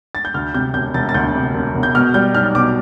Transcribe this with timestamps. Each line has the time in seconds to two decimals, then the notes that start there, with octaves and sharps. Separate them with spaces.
0.15 A6
0.25 G6
0.34 D2 F6
0.54 C3 G6
0.74 E1 G6
0.94 E1 A6
1.09 A6
1.14 D2 G6
1.35 C3
1.54 E1
1.75 E1
1.83 G6
1.94 B2 F6
2.14 G3 G6
2.35 B1 F6
2.55 B2 D6